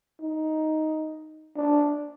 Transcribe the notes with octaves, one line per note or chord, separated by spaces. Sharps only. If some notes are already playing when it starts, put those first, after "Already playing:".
D#4
D4